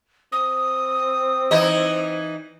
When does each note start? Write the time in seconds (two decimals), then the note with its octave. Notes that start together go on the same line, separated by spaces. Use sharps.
0.32 C4 D#6
1.51 E3 D#4 D#5